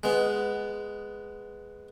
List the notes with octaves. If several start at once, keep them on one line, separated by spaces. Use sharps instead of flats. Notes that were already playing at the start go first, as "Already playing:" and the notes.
G#3 B3